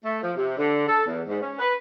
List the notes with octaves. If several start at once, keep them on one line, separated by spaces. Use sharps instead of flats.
A3
F3
C3
D3
A4
E2
G#2
C#4
B4